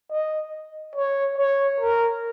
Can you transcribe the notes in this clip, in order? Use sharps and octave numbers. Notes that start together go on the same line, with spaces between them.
D#5
C#5
C#5
A#4